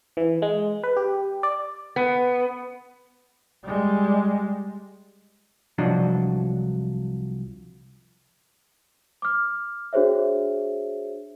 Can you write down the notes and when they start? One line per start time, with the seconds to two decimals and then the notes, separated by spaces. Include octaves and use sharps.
0.17 E3
0.42 G#3
0.83 B4
0.97 G4
1.43 D5
1.96 B3
3.64 G3 G#3
5.78 C2 F3 F#3 D4 D#5
9.22 D6 F6
9.93 D4 F#4 G#4 C5 C#5 E5